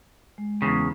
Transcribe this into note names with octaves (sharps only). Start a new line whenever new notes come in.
G#3
E2 C#3